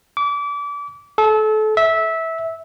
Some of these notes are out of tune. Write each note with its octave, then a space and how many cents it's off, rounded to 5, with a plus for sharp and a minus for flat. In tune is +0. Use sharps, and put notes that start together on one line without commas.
D6 -30
A4 -30
E5 -15